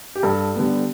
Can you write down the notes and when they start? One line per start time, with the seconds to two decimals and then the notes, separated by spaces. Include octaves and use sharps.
0.15 G4
0.23 G2 A4
0.55 D3 G3 B3